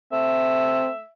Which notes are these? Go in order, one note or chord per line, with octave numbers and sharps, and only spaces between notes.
A3 C4 E5